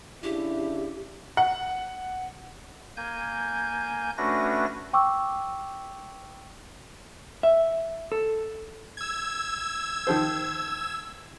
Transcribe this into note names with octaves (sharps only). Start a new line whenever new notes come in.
C#3 D4 E4 G4
F#5
A#3 G#5 G6
A3 C#4 D4 F#4 B4 A#6
G5 C#6 D6 E6
E5
A4
E6 G#6
D#3 F3 C5